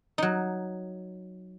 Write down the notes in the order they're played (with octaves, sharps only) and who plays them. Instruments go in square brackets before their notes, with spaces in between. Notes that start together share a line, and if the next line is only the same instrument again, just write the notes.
[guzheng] F#3 D#4